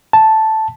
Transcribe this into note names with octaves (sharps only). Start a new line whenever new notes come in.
A5